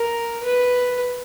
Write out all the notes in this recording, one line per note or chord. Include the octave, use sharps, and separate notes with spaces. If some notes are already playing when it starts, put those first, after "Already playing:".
Already playing: A#4
B4